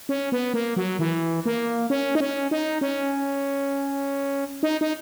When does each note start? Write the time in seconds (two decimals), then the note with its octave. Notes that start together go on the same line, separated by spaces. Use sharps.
0.09 C#4
0.32 B3
0.54 A#3
0.76 F#3
0.99 E3
1.46 A#3
1.90 C#4
2.15 D#4
2.20 C#4
2.51 D#4
2.81 C#4
4.63 D#4
4.81 D#4